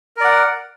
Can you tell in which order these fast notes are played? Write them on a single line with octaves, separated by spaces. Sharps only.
A#4 D5 F#5